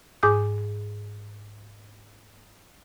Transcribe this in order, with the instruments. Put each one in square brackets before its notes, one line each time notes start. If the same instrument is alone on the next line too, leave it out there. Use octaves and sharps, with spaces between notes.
[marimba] G#2 G#4 G#5 D6 D#6 G6